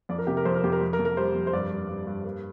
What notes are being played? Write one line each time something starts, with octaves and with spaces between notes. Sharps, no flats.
F2 D5
A#4
C3 G4
A#4
F2 C5
A#4
F2 G4
A#4
F2
A#4
F2
A#4
G3 C5
F2
C5
G2 D5
G2
G2
G2
A#3